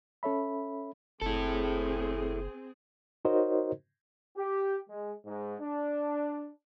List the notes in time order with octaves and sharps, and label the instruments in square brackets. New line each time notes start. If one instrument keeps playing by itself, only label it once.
[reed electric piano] C#4 A4 C#5 E5 B5
[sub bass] F#1 [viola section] C4 G#4 [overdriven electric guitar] E4 A4
[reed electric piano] D#4 F#4 A#4 C5 C#5 D#5
[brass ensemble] G4
G#3
G#2
D4